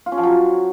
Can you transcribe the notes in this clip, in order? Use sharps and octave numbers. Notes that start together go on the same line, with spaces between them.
F4
C#4
F3
F#3